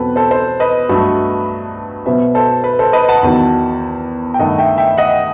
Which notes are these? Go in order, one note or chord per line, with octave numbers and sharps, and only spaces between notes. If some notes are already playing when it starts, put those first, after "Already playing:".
Already playing: E2 B2 F#3 C4 A4 B4
A4 C5
A4 C5
B4 D#5
G2 F#3 A3
B2 F#3 B3 C5 E5
A4 C5
B4
A4 C5
B4 D#5
F#5 A5
E2 D#3 F#3
G5
G2 D#3 A3 D#5 F#5
E5 G5
E5 G5
D#5 F#5